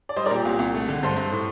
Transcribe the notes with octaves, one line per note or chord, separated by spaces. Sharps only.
D5
G3 C5 D#5
A#4 D5
A#2 G4
C2 G4
C2
A3
D3
G2 A4 C5
G2
A2